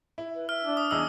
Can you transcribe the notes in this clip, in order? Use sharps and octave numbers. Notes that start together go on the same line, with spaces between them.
E4
B4
E5 F6
D4
D#6
E2 G#4 D#5 E6